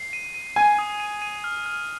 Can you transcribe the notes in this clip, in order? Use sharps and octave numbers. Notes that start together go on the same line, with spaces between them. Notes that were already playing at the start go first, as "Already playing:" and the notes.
Already playing: C7
D#7
D#7
G#5 D#7
D#6
D#7
D#7
F6
F6